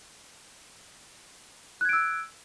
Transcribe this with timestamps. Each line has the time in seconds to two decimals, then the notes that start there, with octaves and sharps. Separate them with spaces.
1.81 F#6
1.85 G#6
1.89 D7
1.93 E6